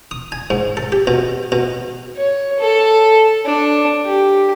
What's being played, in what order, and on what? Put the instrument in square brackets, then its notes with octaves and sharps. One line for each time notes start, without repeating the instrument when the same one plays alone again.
[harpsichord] D#6
G#5
G#2
A4
G4
B2
B2
[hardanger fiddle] C#5
A4
D4
G4